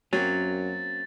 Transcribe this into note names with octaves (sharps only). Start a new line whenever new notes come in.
F#2 F#3 A#3 C4 C#4 A6